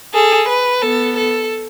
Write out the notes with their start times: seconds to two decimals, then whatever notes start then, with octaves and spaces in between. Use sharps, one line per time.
0.14 G#4 A4
0.49 B4
0.82 B3 A4
1.17 A4